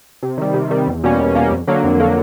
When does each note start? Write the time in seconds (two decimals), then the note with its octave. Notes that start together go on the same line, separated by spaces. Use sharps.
0.23 C3
0.38 D#3 G3
0.54 C3
0.71 D#3 G3
0.87 E2
1.03 B2 G3 A#3 C#4
1.19 E2
1.35 B2 G3 A#3 C#4
1.51 F2
1.67 D3 F#3 A#3
1.84 F2
2.00 D3 F#3 A#3